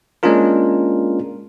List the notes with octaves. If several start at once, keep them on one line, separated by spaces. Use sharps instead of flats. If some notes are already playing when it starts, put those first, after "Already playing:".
G#3 A#3 C#4 D4 F4 A#4